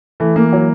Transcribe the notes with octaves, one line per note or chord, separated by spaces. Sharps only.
E3 A3
E3 A#3
F#3